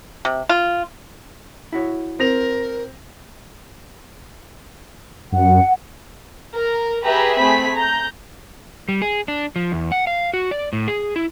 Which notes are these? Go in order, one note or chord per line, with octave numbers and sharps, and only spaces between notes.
C3
F4
E4 F#4 C#5
C4 A#4 A#6 F7
F#2 F#5
A#4
G4 G#4 B4 E5 A#5 B5
A3 C4 G#4 B5 B6
A#5 G6
G3
G#4
D4
F3
E2
F#5
F5
F#4
D5
A2
G#4
E4